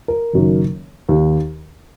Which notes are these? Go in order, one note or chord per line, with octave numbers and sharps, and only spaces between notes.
A#4
F#1 F#2 D#3
D#2 D#3